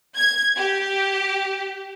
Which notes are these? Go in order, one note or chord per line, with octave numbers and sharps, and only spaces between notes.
G#6
G4